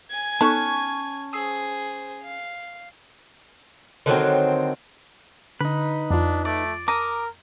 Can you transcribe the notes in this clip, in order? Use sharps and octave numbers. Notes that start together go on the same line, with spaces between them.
G#5 G#6
B3 C#4 D#4 A4 A5 C#6 F#6
G#4 C5 D#6 E6 C7
F5
D3 D#3 F#3 C4
D3 D#4 B4
F2 D4 F4
A3 D5
A#4 A#5 D6 D#6